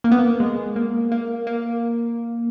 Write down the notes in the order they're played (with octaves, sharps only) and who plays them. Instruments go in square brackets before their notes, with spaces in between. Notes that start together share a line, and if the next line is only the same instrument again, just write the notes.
[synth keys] A#3
B3
A#3
G#3
A#3
A#3
A#3